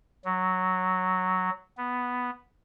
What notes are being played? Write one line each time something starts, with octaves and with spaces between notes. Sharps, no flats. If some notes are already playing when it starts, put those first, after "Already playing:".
F#3
B3